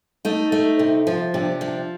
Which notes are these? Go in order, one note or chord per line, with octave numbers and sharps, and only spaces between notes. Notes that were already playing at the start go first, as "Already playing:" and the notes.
A3 D#4
A3
C3
F3
C3 D4
F3